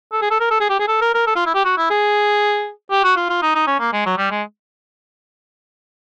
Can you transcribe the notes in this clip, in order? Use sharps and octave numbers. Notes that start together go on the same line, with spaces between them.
A4
G#4
A4
A#4
A4
G#4
G4
G#4
A4
A#4
A#4
A4
F4
E4
G4
F#4
E4
G#4
G4
F#4
F4
F4
D#4
D#4
C#4
A#3
G#3
F#3
G3
G#3